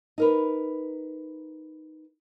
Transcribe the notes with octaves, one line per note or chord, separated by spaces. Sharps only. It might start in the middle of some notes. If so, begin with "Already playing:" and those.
D#4 A#4 B4